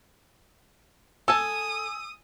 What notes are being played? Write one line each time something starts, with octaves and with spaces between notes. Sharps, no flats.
A4 G#5 A5 D#6 E6